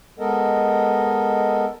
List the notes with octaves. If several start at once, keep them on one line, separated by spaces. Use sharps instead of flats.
G#3 B3 A4 A#4 D#5